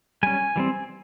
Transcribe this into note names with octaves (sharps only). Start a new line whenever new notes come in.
G3 C#4 G#5
E3 G3 C4